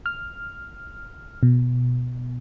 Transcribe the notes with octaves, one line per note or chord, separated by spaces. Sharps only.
F6
B2